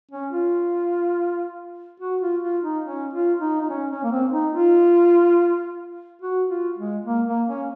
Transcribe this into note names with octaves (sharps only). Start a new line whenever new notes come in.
C#4
F4
F#4
F4
F4
D#4
C#4
F4
D#4
D#4
C#4
C#4
A#3
C4
D#4
F4
F#4
F4
G#3
A#3
A#3
C#4